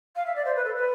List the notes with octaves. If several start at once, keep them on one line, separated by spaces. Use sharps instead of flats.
F5
E5
D5
C5
B4
A4
B4